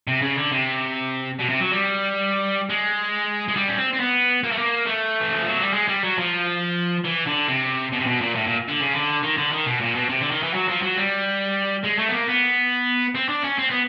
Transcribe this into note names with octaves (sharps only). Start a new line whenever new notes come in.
C3
C#3
D3
C3
B2
C3
F#3
G3
G#3
G#3
G3
C#4
C4
C4
B3
A#3
A3
A#3
A3
E3
F3
F#3
G3
G#3
G3
F#3
F3
E3
D3
C3
B2
C3
B2
A#2
A2
A#2
D3
C#3
D3
D#3
D3
D#3
B2
A#2
B2
C3
D3
D#3
E3
F#3
F3
F#3
G3
G#3
A3
B3
A#3
B3
C4
D4
C#4
C4
B3